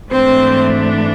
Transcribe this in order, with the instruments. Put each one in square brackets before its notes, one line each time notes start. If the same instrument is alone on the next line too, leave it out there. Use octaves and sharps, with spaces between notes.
[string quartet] G#2 E3 A3 C4 D4 C5